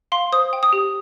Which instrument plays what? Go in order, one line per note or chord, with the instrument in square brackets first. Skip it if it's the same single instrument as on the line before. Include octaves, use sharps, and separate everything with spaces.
[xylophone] F5 C6
C5 D#6
G5
D#6
G4